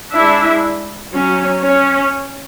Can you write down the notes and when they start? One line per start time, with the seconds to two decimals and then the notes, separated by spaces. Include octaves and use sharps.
0.12 G#3 D4 E4 E5
1.12 F#3 C#4
1.62 C#4 C#5